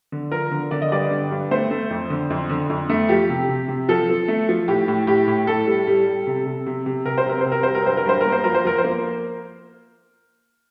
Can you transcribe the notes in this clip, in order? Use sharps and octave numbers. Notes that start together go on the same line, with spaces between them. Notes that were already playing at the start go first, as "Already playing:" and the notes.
D3
F3 A#4
D3
D3 D5
D#5
G2 D5
D3
G2
A3 C5
A3
F2
D3
F2
D3
F2
A3
F3 G4
C3
C3
C3
F3 A4
F3
A3
F3
A2 G4
A2
A2 G4
A2
A2 A4
G3
G3
G3
C3
C3
C3
C3
C3 A#4
C5
C3 A#4
C5
C3
A#4
G3 C5
A#4
G2 C5
A#4
G2 C5
A#3 A#4
C5
F3 A#4
C5
F3 A#4
C5
A#3